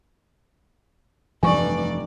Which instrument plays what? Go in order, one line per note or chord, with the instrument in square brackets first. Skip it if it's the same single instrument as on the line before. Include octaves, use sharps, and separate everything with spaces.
[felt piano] F1 [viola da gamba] G2 D5 [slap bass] E3 G3 A3 [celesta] G#5 C#6